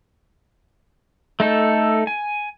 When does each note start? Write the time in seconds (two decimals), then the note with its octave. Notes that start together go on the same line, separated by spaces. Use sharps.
1.40 A3 D#4 A4
2.07 G#5